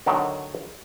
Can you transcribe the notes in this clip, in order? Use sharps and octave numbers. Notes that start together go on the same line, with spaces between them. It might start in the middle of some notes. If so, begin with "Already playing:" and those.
D3 D#3 F#3 A3